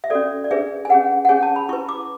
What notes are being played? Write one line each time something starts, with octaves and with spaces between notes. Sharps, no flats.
E5
C#4 F#4 A4 D5
D5
D4 G#4 B4 E5
G#5
C#4 G#4 B4 F#5
F#5
C#4 G#4 C#5 G#5
A5
B5
E4 B4 C#6
D6